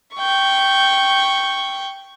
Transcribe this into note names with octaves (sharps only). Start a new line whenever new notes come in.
G5 C#6